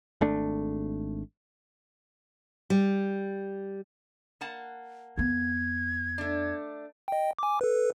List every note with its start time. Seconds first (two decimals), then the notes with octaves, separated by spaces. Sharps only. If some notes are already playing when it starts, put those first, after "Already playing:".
0.21 G#1 A3 D4
2.70 G3
4.41 A#3 F#5 A5
5.18 F2 B3 G#6
6.18 A3 D4
7.08 D#5 G5
7.39 G#5 D6
7.61 A4 B4